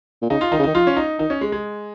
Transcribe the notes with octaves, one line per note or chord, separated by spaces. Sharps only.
A#2
C#3 D#4
F4
D#3 D#4
C#3
D#3 D#4
F3 F4
C#4
D#4
D#3 D#4
C#4
G#3
G#3